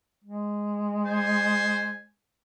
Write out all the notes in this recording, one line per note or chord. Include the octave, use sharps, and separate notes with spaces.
G#3
C5 G#5